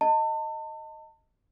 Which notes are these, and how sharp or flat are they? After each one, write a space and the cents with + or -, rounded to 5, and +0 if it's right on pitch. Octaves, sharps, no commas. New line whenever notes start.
D#5 +0 A5 +35